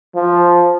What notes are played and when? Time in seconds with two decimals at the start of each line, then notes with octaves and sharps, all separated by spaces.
0.15 F3